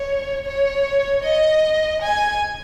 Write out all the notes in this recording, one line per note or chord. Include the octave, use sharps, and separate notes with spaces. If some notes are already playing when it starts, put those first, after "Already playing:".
Already playing: C#5
C#5
D#5
G#5